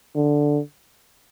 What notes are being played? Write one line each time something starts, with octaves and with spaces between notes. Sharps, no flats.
D3